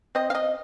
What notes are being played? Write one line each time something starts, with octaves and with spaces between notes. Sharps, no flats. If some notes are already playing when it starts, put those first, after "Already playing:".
C4 D#5
F5
D#5